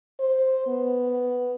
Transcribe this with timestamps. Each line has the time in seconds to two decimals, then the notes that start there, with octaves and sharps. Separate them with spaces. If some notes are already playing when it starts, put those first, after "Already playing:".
0.19 C5
0.67 B3